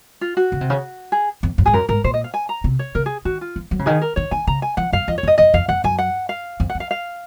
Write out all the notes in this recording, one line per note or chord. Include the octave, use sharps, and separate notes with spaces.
F4
F#4
C#3
C3
C#3
G#4
F2
F#2
G#2 G#4
F#2 A#4
G#2 A#4
A#2 C5
D#5
F5
G#5
A#5
C3
C#5
C#3 A#4
G#4
D#3 F#4
F4
F3
F#3
C#3
D#3 G#4
A#4
D#3 C#5
D#3 G#5
C#3 A#5
G#5
F3 F#5
F#2 F5
F2 D#5
C#5
F#2
D#5
F#2 D#5
F2 F5
F#2 F#5
F#2 G#5
F#5
F5
F2
F#5
F2
F5
F5